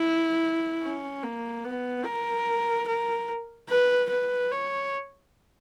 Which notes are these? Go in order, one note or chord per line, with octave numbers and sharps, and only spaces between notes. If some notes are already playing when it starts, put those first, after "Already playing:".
Already playing: E4
C#4
A#3
B3
A#4
A#4
B4
B4
C#5